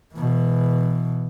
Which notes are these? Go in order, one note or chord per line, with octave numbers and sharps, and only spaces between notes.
B2 E3